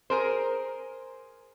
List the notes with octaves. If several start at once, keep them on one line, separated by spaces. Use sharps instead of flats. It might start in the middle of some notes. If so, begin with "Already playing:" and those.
G#4 A#4 C5